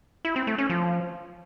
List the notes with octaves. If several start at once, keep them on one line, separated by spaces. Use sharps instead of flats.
E4
C4
A3
C#4
F3